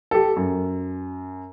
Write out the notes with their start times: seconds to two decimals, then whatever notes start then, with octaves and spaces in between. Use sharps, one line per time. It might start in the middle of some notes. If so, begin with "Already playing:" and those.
0.11 G4 A4
0.36 F#2